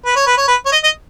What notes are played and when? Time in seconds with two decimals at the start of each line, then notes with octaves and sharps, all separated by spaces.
0.05 B4
0.16 C#5
0.26 B4
0.37 C#5
0.48 B4
0.66 C#5
0.72 D#5
0.83 D#5